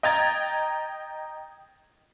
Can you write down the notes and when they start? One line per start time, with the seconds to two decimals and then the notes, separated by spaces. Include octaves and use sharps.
0.03 D#5 G5 A#5 G#6 A6